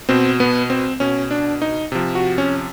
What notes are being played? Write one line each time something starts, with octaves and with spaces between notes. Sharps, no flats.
B2 C4
B3
C4
B2 C#4
D4
D#4
C3 F3
F#4
C#4